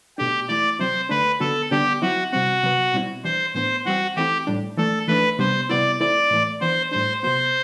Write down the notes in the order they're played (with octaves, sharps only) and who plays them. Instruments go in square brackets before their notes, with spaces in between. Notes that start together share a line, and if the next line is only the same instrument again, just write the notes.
[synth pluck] B2 A3 D4 [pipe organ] G4
[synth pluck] E3 A3 E4 [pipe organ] D5
[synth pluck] C3 F#3 C4 [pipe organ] C5
[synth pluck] D3 A3 D4 [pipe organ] B4
[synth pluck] D3 F#3 B3 [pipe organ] A4
[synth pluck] D3 G3 B3 D4 [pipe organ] G4
[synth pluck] F#3 C4 E4 [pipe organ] F#4
[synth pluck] C3 G3 C4 [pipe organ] F#4
[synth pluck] C3 F#3 B3
B2 G3 C4 E4
[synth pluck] E3 G3 D4 [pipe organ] C5
[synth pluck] A2 E3 B3 D4 [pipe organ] C5
[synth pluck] E3 G3 C4 [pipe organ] F#4
[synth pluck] E3 A3 C4 E4 [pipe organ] G4
[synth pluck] A2 G3 D4
[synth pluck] E3 A3 D4 [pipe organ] A4
[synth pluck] E3 A3 D4 [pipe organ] B4
[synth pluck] C3 G3 B3 D4 [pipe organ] C5
[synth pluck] C3 G3 B3 E4 [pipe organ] D5
[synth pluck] E3 A3 C4 E4 [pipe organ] D5
[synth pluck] A2 E3 A3
[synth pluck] E3 B3 D4 [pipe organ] C5
[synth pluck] A2 G3 D4 [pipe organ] C5
[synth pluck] C3 F#3 B3 [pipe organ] C5